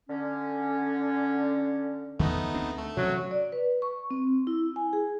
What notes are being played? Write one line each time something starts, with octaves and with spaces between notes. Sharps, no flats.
D3 C#4
E2 D#3 A3 B3 D#4
D2 C4 D4
A3
C3 E3 F#3 C#4
D5
B4
C#6
C4
E4
G#5
G#4